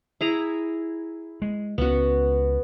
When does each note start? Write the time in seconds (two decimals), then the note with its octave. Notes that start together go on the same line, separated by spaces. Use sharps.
0.21 E4 G#4 A#5
1.42 G#3
1.78 C#2 B3 C#4 F#4